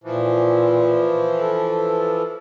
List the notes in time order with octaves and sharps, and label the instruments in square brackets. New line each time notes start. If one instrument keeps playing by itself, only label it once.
[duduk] A#2 [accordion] E3 F3
[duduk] A4